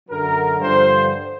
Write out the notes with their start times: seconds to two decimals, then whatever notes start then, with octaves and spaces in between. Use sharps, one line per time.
0.09 F#2 D3 F#3 A#4
0.60 G2 D3 F3 C5